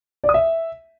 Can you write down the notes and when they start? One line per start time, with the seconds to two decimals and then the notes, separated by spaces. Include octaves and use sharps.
0.24 D5
0.29 D#6
0.34 E5